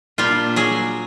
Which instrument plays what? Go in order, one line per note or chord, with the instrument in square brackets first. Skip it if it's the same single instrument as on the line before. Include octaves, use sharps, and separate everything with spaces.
[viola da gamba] A#2 D4 [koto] G3 F4
[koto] F#3 G#4